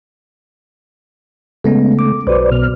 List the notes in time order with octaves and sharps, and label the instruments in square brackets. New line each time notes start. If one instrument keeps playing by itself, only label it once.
[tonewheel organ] C#3 A3 [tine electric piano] G#3 B3 C#4
[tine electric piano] D6
[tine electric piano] B1 F#4 [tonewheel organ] B4 C5 D5
[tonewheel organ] B2 F6